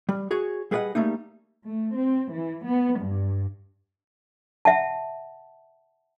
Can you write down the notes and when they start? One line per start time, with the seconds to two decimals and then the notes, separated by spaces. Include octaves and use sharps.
0.09 G3
0.31 F#4 G#4 C#5
0.71 G3 G#4 B4 D5 D#5 F#5
0.95 G3 A3 A#3 D#4
1.66 A3
1.98 C4
2.35 E3
2.66 B3
3.02 G2
4.65 E5 F#5 A5